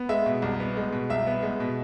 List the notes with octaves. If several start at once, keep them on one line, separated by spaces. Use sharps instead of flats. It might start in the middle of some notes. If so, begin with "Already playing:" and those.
Already playing: B3
G#3 E5
B2
C2
B3
G#3
B2
C2 E5
B3
G#3
B2